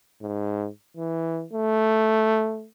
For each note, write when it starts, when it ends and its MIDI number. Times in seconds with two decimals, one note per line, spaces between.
0.22 0.68 44
0.97 1.44 52
1.53 2.67 57